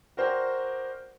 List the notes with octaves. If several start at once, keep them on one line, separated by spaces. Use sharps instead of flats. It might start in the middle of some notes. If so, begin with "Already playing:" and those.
F#4 A#4 C5 D5 G5